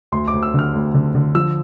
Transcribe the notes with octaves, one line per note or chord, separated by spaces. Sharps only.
D2 C6
D6
D2
E6
D3 F6
D2
D3
D3
F3 E6